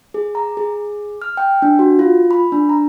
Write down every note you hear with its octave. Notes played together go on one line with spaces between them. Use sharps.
G#4
A#5
G#4
F6
G5
D4
F#4
F4
B5
D4
A#5